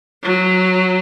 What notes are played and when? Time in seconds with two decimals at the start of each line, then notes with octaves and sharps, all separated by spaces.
0.23 F#3